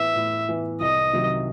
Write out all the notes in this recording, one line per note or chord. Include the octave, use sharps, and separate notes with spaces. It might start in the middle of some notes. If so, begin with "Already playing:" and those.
Already playing: A2 E3 B3 E5
A2
E3 B3
C2 D#5
C3 D#3 F#3